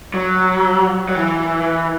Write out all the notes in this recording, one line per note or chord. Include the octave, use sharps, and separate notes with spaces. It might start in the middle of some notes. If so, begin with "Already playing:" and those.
F#3
F#3
E3